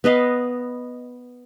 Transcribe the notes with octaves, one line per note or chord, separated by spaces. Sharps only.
B3 B4 D#5 F5